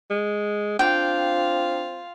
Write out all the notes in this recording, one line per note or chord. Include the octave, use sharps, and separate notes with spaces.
G#3
C4 D4 F4 F5 G5